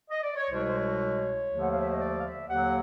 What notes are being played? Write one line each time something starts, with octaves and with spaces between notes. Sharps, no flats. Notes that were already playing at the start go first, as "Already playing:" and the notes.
D#5
D5
C#5
C2 B2 G#3 C5
C5
C#5
D#2 D3 F3 A3
F#5
F5
E5
D#5
D5
F5
E5
D#2 D3 F#3 A#3 F#5